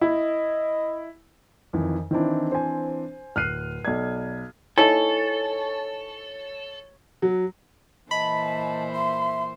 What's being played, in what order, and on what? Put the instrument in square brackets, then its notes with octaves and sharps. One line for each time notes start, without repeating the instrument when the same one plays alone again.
[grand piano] E4 [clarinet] D#5
[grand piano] F2 D#3 E3
[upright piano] D#3 E4 [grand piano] E3 C4 D4
[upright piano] C5 G#5
[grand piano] D1 F#6 D#7 [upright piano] F6 C7
[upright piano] B1 G#6 [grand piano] D5
[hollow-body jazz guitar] D#4 E4 G#5 [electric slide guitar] A4 [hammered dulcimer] C#5
[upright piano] F#3
[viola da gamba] A#2 E3 C5 [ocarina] D#5 [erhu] A5 [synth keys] B5
[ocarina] E5 [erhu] C6